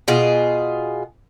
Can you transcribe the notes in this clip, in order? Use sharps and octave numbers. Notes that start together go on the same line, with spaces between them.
B2 F4 G#4